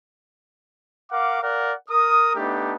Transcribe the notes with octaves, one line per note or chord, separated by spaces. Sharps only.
A#4 F5 F#5 D6
A#4 D5 F5 F#5
A#4 D#6
A3 B3 D4 D#4 G4